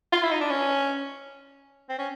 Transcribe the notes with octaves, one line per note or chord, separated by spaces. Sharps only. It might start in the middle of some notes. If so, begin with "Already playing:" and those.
F4
E4
D#4
D4
C#4
C4
C#4